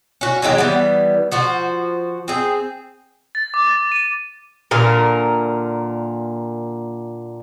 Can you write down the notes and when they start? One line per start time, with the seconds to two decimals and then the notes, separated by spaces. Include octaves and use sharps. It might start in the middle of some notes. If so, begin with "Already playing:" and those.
0.21 C#4 F#4
0.42 E3 F#3 G#3 G4
0.58 E3 G3 B3
1.32 F3 F#4 C5
2.28 C4 G#4
3.35 A6
3.54 D6
3.67 A6
3.92 D#7
4.71 A#2 D3 A#4